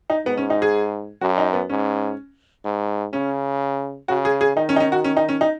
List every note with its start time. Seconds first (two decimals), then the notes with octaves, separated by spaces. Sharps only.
0.10 D#4
0.26 G#2 B3
0.37 C#4
0.50 D#4
0.62 G#4
1.21 F#2 F#4
1.38 D#4
1.53 B3
1.70 G#2 C#4
2.65 G#2
3.13 C#3 C#4
4.08 C#3 F#4
4.25 G#4
4.41 G#4
4.56 D#3 D#4
4.69 C#4
4.76 D#4
4.80 C#4
4.92 F#4
5.04 C#4
5.17 D#4
5.29 C#4
5.41 D#4